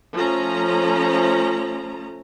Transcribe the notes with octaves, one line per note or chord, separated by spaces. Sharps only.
F3 A3 C#4 A#5